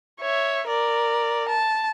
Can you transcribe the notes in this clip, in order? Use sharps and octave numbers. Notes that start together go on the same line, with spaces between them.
C#5 E5
A#4 D5
A5